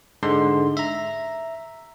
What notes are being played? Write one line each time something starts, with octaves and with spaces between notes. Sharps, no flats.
G#2 D3 G#3 C6
E5 A#5